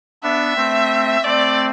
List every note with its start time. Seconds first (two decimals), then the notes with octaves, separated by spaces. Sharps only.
0.23 B3 D4 E5
0.56 A3 C4
1.24 A3 C4 D5